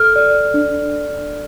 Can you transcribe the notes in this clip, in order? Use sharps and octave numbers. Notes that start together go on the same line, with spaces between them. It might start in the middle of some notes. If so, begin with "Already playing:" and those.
Already playing: A4 F6
D5
D4